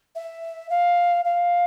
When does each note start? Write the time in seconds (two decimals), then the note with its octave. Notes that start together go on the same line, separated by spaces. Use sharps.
0.15 E5
0.70 F5
1.25 F5